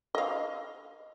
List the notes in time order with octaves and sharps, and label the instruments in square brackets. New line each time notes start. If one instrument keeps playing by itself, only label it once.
[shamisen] D#5 F5